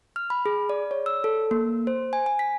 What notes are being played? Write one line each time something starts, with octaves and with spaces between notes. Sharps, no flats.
F6
B5
G#4
D5
C#5
E6
A4
A#3
C5
G#5
G#5
B6